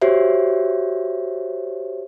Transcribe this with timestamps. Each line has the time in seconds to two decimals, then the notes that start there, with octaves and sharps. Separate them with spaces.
0.02 F#4 G4 C5 C#5 E5